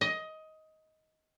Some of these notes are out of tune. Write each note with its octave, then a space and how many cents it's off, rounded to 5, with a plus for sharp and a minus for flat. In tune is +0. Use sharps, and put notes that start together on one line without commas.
D#5 +15